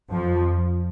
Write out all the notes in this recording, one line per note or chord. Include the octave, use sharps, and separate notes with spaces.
F2 F3